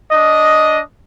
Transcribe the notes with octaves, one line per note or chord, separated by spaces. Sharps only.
D4 D#5